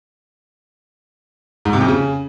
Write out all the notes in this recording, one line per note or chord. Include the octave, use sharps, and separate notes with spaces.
G#2
C3
F2
C#3